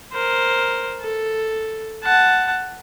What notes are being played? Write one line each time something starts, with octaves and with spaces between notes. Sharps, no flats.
A#4 C5
A4
F#5 A5